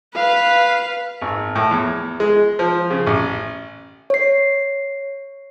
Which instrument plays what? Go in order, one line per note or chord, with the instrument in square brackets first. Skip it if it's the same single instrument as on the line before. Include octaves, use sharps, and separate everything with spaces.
[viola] B4 [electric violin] F5
[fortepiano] G#1
A2
E2
G#3
F3
C#3
A1
[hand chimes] C#5 C7